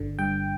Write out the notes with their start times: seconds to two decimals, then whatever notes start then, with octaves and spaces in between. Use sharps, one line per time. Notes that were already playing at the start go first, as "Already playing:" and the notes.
Already playing: G1 D3
0.19 G2 G5